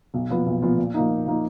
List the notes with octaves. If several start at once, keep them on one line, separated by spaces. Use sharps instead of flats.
B1
A#2 F3 B3 F4
B1
A#2 F3 B3 F4
A#2
F3 A#3 D#4
A#2
F3 A#3 D#4